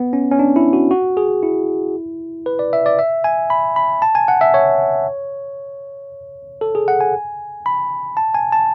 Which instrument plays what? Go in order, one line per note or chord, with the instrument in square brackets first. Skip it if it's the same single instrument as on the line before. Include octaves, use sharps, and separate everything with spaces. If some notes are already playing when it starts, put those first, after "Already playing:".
Already playing: [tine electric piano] B3
C#4
C#4
D4
E4
F#4
F#4
G#4
E4
B4
D5
E5
D5
E5
G#5
B5
B5
A5
G#5
F#5
E5
C#5
A4
G#4
F#5
G#5
B5
A5
G#5
A5